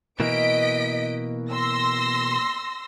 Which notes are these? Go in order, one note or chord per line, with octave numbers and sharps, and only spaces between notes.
B2 E3 A#3 D#5 B6 D7
C6 E6 A#6